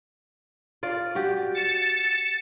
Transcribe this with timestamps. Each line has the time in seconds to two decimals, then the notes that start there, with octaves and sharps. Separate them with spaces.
0.83 F4 D5
1.15 F#4 G4
1.54 A6 C#7 E7